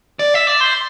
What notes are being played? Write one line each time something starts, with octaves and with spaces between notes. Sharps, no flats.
D5
E5
D5
C5